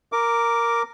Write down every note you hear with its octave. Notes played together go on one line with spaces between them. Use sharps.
A#4 D6